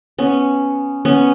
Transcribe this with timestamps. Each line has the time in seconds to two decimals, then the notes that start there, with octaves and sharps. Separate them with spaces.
0.19 B3 C#4
1.05 B3 C#4